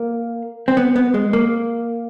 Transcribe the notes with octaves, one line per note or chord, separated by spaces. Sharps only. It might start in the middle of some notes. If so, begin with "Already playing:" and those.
Already playing: A#3
C4
B3
B3
G#3
A#3